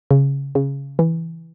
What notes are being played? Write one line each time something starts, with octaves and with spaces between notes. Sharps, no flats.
C#3
C#3
E3